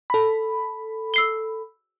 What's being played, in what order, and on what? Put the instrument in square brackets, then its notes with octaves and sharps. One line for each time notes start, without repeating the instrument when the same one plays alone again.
[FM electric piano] A4 B5
[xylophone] E6 C7 G7